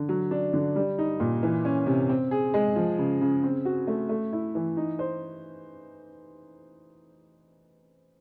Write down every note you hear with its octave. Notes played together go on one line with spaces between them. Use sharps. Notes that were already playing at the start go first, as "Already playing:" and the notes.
Already playing: D3
F#3
D4
D3
G3
D#4
A#2
E3
C#4
C3
C4
G#4
G#3
F3
C#3
C#3
C4
F#4
A3
A3
E4
E3
D#4
C5